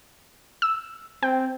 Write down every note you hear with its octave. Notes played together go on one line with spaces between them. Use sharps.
E6
C4 G5